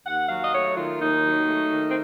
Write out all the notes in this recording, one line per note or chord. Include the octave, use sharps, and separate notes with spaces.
D#2 F#5
F#3 F5
D#5
A3 C#5
D#3 F4
D#2 D#4
F#3
A3
D#3
C4